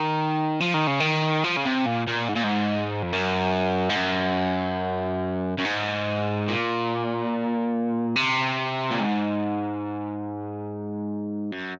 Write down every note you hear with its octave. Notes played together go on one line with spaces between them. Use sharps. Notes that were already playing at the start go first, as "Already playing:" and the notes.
Already playing: D#3
F3
D#3
C#3
D#3
F3
C#3
C3
A#2
A#2
G#2
A#2
G#2
F2
F#2
G#2
F#2
F#2
G#2
A#2
C3
A#2
G#2
F#2